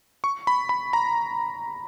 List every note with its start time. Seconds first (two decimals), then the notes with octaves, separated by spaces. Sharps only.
0.24 C#6
0.47 B5
0.69 B5
0.93 A#5